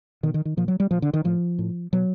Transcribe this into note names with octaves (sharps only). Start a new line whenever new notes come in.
B2 D#3
D#3
D#3
A#2 F3
F#3
G3
A#2 F3
D3
D#3
A2 F3
A2
B2 F#3